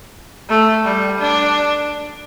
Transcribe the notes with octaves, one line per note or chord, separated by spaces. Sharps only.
A3
G3
D4